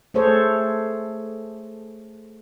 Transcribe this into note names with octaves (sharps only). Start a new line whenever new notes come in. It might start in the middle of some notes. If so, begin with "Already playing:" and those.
A3 G#4 A4 C5 C#5